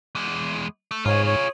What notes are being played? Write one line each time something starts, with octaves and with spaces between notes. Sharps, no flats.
E2 G#3
A3
G#2 F4 G#4 C#5
C#5